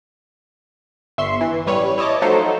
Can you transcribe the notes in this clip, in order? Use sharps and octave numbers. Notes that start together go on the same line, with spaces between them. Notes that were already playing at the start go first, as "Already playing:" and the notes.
G1 E5 C6 C#6 C7
E3
A1 G3 B4 C#5
E4 C#5 D#5 A5 D6
F3 F#3 A3 D#4 A4 C5